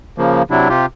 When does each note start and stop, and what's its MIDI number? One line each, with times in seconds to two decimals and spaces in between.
0.18 0.43 49
0.18 0.43 53
0.18 0.43 58
0.50 0.68 48
0.50 0.68 54
0.50 0.68 62
0.50 0.68 64
0.69 0.86 48
0.69 0.86 65
0.69 0.86 67